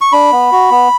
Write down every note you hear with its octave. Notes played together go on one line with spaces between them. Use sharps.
C#6
D4 B5
B3
F#4
B3